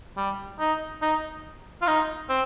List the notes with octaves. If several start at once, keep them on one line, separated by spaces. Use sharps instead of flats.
G3
D#4
D#4
F4
D#4
C4